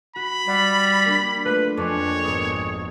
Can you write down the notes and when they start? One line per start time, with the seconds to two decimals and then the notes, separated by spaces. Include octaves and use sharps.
0.16 F#4 B5
0.47 G3 D5 F#5 B6
1.06 A#3 D4
1.45 A3 F4 B4
1.77 F2 A#3 D4 C#5 G#5
2.24 G#1 B3 G#4 C#6